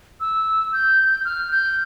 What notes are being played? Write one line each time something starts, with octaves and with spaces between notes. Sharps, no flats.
E6
G6
F6
G6